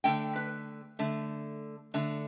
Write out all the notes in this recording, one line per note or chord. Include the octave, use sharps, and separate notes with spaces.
D3 A3 G5
B4
D3 A3
D3 A3